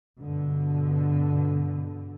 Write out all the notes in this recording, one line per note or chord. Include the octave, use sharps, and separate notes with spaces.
G2 B2 D3